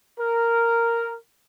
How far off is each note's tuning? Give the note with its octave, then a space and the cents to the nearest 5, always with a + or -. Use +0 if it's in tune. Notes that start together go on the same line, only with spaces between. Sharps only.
A#4 -5